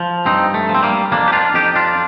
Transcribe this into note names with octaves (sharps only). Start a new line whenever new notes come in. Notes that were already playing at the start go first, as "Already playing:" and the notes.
Already playing: F3
G2 C4 D#4
A3
F3
C4
G3 A#3
F2 A#3 D4
G4
D4 F4
F2 D#4 G4
D4 F4